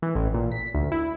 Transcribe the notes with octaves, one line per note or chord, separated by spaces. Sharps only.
E3
A1
A#2
B6
D2
E4